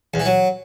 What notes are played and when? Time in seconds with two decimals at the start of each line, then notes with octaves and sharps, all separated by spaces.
0.14 E2
0.20 E3
0.25 F#3